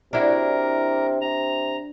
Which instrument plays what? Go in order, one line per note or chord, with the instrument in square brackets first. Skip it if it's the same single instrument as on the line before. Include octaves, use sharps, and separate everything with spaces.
[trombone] C3 [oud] D4 E4 F#4 [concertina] A#4
[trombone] C3 [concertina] A#5